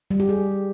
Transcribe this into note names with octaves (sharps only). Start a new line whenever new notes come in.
G3
G4
G#4